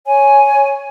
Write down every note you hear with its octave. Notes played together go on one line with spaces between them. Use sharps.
C#5 G#5